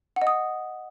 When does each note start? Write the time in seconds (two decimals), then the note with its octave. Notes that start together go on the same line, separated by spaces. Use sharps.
0.16 F#5
0.22 D#5
0.27 D#6